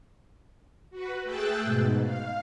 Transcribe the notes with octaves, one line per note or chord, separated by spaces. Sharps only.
F#4 B4
A3 G#4 G5 E6 F#6 A6
G#2 B2
F5